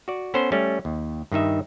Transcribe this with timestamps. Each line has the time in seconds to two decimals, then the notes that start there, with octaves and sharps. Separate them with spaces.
0.08 F#4 D5
0.34 B3 C#4 A4 B4 C5
0.52 G3 A3 C#4
0.85 D#2
1.32 G2 D#3 D#4 E5